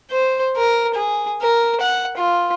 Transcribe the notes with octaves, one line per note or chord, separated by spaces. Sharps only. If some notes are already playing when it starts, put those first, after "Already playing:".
C5
A#4
G#4
A#4
F#5
F4